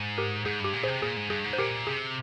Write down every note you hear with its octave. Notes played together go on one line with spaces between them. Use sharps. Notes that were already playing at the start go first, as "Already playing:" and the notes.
Already playing: G#2
G4 A#4
G#2 G#4
G2 G4
A#2
G#4 C5
C3
A#2 G#4
G#2
G2 G#4
G#2
C5
A#2 G4 A#4
C3 G#4